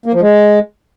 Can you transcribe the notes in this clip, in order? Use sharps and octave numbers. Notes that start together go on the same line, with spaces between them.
A#3
F3
G#3